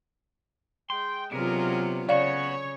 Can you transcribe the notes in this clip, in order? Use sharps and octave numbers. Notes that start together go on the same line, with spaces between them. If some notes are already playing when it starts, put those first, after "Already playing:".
G#3 G5 C6
C3 E3 F#3 B3 D4 F4 G#4 A#4
C#3 B3 F#4 C#5 D5 F5 F#5